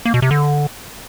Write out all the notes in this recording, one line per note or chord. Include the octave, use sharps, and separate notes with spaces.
A#3
B2
C3
D3